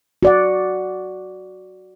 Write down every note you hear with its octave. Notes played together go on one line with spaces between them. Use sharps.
F#4 D5 F#5